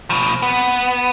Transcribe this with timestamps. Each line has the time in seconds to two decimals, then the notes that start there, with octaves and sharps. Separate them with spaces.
0.10 B2 F3
0.42 B3